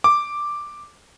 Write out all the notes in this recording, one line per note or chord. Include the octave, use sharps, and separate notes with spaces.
D6